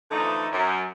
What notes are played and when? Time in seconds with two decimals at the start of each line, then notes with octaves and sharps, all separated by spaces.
0.11 D3 E3 F3 A3 D#4
0.52 F#2